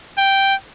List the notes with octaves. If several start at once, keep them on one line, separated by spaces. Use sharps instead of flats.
G5